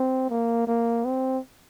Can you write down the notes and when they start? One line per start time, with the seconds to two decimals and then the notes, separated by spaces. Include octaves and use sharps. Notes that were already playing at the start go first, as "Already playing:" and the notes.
Already playing: C4
0.30 A#3
0.67 A#3
1.05 C4